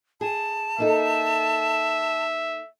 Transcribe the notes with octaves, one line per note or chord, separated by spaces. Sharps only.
G#4 A5
A#3 D#4 A4 E5